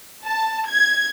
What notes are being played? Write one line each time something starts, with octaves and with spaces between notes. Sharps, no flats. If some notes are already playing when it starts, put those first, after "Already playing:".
A5
G#6